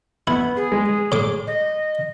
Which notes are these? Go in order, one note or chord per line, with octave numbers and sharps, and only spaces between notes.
B3 E4
G#4
G#3
A2 D6
D#5